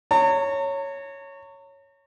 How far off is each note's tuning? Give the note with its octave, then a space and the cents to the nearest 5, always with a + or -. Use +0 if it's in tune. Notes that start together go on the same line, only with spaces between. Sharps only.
C#5 +0 A#5 -40